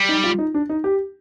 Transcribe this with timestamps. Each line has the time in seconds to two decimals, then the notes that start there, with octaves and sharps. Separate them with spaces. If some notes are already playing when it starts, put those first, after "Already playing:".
Already playing: G3
0.09 D#4
0.24 F4
0.39 D#4
0.54 D4
0.69 D#4
0.84 G4